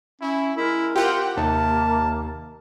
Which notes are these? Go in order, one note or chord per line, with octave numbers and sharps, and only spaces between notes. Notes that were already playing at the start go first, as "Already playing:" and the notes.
C#4 E4
G#3 E4 A#4
C4 F4 G4 F#5 G5
D#2 C3 A#3 A5